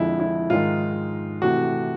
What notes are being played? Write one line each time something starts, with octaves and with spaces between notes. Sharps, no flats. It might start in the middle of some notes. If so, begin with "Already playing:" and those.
Already playing: F2 D3 F3 G#3 E4
E4
G#2 D#3 G#3 F4
C3 E3 A3 F#4